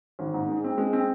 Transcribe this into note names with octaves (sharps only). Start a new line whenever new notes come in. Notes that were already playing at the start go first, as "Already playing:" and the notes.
G#1
G#2
G#3
C4
G#3
C4